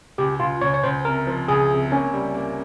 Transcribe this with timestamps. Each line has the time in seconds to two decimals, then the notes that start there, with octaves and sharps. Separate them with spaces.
0.18 C#2 G4
0.40 C#2 F4
0.61 C#2 C#5
0.74 C#5
0.83 C#2 C5
1.05 C3 A#4
1.27 F3
1.48 C#2 G#4
1.70 C3
1.91 A#3 C#4
2.13 G3
2.34 A#3